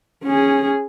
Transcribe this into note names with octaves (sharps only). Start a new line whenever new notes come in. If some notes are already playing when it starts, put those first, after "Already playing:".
C#4 G#4